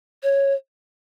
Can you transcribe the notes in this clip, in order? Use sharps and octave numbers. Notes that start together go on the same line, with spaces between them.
C#5